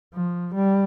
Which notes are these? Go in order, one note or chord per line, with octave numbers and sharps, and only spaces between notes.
F3
G3